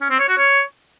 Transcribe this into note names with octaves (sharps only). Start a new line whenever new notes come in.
C#4
C4
C#5
F#4
C#5